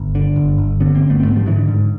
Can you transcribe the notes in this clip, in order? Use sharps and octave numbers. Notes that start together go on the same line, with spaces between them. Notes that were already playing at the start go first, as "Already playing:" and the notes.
Already playing: G1
D3
G1
G1
D3 B3 C#4
A#3 C4
G1
A3 B3
C4
G#2 A3 B3
F3 G3
G#2 D3 E3
D3
G#2 D3